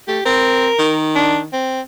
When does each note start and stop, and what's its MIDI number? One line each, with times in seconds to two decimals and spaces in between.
0.08 0.19 57
0.08 0.24 67
0.25 0.68 60
0.25 0.97 70
0.79 1.48 51
1.15 1.38 62
1.52 1.81 60